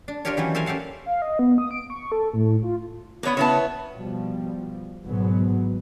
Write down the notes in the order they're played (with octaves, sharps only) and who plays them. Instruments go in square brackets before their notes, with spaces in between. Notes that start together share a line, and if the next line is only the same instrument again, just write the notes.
[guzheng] D4
D4 F4 G4 A#4 C#5
D#3 E3 F#3 C#4
A4 A#4 C5 E5 F5 G#5
C#4 G4 A4 F5 F#5
[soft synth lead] F5
D#5
B3
D#6
D7
C#6
A4
A2
F4
[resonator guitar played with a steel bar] A#3 B3 [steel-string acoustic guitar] D4 C#5 F#5
[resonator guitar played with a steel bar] C#3 A5 [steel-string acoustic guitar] B3 E4 C#5
[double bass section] B2 F3 G3
G#1 G#2 B2 F#3 B3